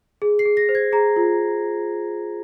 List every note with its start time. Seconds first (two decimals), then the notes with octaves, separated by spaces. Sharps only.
0.22 G#4
0.39 C7
0.45 G#4
0.57 A#6
0.69 C5
0.75 G#6
0.92 G#4 A#5
1.16 F4